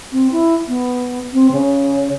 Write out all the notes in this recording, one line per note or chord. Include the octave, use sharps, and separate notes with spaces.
C4
E4
B3
C4
C#3